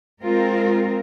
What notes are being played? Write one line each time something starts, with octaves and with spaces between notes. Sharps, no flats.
G#3 C4 F4 A#4